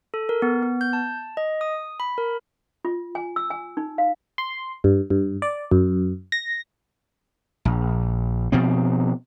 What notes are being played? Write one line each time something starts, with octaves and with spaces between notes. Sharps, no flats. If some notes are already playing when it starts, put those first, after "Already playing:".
A4
A#4
B3
B3
G6
A5
D#5
D#6
B5
A#4
F4
G#5
E6
G#5
D#4
F5
C6
G2
G2
D5
F#2
A#6
A#1
B2 F3 C4